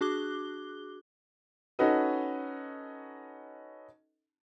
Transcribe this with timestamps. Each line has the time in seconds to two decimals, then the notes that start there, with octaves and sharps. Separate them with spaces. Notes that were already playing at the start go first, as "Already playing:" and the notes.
0.01 D4 F#4 G#4 D6 F#6 G7
1.79 C#4 D#4 F#4 A4 B4 D#5